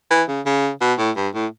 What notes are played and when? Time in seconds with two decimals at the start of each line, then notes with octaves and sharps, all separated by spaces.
0.11 E3
0.29 C#3
0.46 C#3
0.81 B2
0.98 A2
1.16 G2
1.34 A2